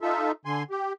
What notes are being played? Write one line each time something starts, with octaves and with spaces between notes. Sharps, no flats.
D#4 F4 A4 E5
D3 G#5 C6
G4